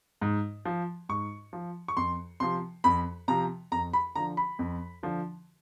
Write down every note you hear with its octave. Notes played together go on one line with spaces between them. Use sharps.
G#2
F3
G#2 C#6
F3
C#6
F2 C6
C3 F3 C6
F2 B5
C3 F3 A#5
F2 A#5
B5
D3 F3 A#5
B5
F2
D3 F3